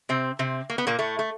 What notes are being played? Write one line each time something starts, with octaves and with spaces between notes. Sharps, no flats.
C3 C4
C3 C4
A#3
B3
A#2 A#3
A2 A3
A3